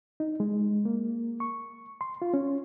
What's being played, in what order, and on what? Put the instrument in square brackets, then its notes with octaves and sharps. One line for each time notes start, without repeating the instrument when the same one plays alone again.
[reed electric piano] D#4
G#3
A#3
C#6
C6
F4
C#4